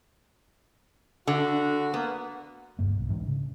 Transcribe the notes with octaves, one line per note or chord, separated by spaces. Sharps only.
D3 F#4
A#3 B3
F#1 D2 G2 A#3
B1
G#2 E3 G#3 D4
C#3